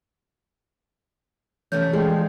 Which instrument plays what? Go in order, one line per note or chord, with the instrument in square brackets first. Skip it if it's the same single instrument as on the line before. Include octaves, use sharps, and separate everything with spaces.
[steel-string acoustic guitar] C3 A3 C#4 [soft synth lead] E3 [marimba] G6
[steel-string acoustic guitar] F3 [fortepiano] G#3 [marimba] G#4 D5 G5